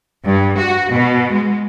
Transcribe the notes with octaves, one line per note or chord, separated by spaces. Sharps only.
G2
F#4
B2
G#3